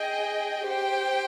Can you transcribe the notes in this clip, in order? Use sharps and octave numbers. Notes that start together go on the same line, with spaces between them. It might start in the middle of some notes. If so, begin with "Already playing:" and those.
Already playing: G#4 D#5 G5
G4 C5 G5